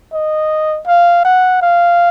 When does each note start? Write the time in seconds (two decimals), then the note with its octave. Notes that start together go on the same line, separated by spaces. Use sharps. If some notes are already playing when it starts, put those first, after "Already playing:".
0.13 D#5
0.87 F5
1.25 F#5
1.62 F5